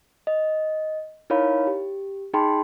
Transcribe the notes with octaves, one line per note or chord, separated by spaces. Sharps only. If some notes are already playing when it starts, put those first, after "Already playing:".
D#5
D#4 E4 A#4 C#5 F5 B5
G4
D#4 G#4 G5 A5 B5 C6